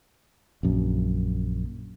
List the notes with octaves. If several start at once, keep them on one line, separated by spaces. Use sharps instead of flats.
A#1 F#2